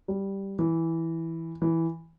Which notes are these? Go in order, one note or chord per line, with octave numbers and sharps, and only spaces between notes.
G3
E3
E3